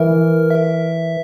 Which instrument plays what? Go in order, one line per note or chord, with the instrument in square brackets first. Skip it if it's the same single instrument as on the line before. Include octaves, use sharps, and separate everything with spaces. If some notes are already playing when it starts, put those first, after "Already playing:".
Already playing: [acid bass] E3 [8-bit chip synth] A#4
[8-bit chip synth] E5